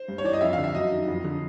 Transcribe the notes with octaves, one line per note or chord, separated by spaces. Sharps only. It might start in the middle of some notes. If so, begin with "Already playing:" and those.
Already playing: C5
G2
C#5
E3 D5
D#5
F2 E5
D3 F5
E5
F#2 D#5
D#3
F2
D3